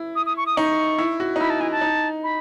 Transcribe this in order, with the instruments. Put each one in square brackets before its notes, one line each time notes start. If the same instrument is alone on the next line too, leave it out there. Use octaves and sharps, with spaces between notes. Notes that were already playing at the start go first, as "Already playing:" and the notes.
Already playing: [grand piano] E4
[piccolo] D#6
D#6
C#6
D#6
[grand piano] D#4 [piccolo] C#6
[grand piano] E4
F#4
D#4
[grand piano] E4 [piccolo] B5
[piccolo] A5
[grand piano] E4 [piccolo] G#5
[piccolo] A5
[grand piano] D#4
[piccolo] B5